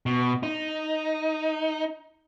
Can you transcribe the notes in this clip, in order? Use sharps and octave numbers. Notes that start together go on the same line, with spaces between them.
B2
D#4